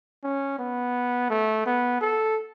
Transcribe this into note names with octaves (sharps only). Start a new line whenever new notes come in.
C#4
B3
A3
B3
A4